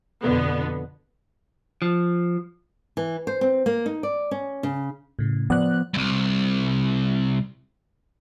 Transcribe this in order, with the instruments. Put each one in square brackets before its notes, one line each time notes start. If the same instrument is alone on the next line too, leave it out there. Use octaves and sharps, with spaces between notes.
[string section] F2 B2 D3 B3
[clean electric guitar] F3
[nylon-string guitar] E3
C5
C4
A#3
D#4
D5
C#4
C#3
[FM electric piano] A2 C#3
[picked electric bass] F3 B3 [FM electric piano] D5 F#6
[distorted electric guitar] C2 G2